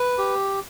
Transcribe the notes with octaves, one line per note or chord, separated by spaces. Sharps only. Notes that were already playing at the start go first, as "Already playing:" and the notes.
Already playing: B4
G4